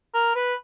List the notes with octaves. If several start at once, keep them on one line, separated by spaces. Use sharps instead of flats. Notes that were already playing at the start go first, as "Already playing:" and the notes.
A#4
B4